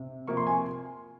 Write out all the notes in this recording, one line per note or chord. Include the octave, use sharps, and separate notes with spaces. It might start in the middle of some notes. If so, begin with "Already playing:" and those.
Already playing: C3
C3 F3 A#3 C#6
C6
G#5